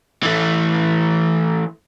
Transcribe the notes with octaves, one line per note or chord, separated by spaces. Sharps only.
E3 A3